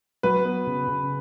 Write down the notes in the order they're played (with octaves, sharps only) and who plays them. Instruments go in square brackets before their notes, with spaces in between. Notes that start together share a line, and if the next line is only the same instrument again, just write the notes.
[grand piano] F#3 [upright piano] B4
[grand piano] B3
C#3
C#3